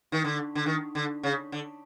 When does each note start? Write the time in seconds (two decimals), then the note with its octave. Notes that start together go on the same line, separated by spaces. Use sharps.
0.12 D#3
0.24 D3
0.55 D3
0.66 D#3
0.95 D3
1.23 C#3
1.52 D3